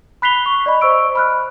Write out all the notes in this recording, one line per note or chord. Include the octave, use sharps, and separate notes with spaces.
B5 F#6 B6 C7 F7 G7
C#6
D5 D#5 B5
C5 D#5 C#6 E6 D7
B5 F6 F#6